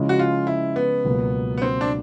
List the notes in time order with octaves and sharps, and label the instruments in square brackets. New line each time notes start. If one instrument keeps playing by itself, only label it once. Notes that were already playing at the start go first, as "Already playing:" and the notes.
Already playing: [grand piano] C#3 F3 G#3 C#4 E4
[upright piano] F#4
F4
E4
B3
[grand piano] C#2 B2 F#3 A#3
[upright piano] B3
C4
D4